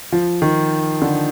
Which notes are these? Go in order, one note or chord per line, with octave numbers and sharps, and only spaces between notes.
F3
D#3
D3